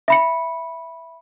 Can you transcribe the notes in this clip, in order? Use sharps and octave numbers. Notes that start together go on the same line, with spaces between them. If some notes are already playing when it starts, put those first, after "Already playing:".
E5 B5 C#7